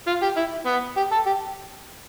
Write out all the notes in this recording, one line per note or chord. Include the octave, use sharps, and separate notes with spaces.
F4
G4
E4
B3
G4
A4
G4